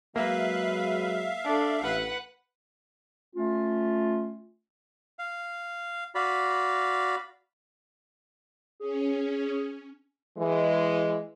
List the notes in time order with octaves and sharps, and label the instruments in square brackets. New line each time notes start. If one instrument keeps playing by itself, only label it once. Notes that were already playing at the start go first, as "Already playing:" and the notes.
[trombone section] F#3 G#3 [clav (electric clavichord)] A#3 [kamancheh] B4 [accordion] E5 F5
[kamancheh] D4 A4
[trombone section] A1 [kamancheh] B4 F#5
[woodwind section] A3 C#4 F4
[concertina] F5
F#4 D5 F5 B5
[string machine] C#4 [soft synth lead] G#4
[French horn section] E3 G#3